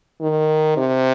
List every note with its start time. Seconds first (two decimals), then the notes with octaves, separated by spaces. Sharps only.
0.21 D#3
0.77 C3